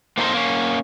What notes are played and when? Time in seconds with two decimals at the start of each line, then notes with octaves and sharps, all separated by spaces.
0.17 A#3 C4 D#4 A4 A#4 C5
0.34 A#3 C#4